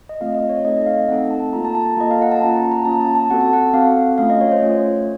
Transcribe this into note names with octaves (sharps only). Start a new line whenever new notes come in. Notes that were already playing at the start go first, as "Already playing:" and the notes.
D#5
A3 C4 F4 A4 F5
D#5
C#5
A3 C4 D#4 A4 D#5
D#5
F5
A3 C4 D#4 A4 F#5
A5
A#3 F4 A4 A#5
A5
A5
A#5
A#3 F4 A4 D#5
F5
F#5
A5
A#3 C#4 F4 A#5
A5
A#5
A#3 C#4 F4 A5
A5
A5
C4 F#4 A4 F#5
A5
F#5
C4 F#4 A4 F5
A3 C#4 F4 F5
D#5
C#5
C5
A3 C#4 F4 C#5